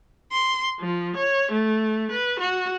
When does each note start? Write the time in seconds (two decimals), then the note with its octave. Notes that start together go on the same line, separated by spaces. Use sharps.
0.31 C6
0.80 F3
1.16 C#5
1.52 A3
2.11 B4
2.40 F#4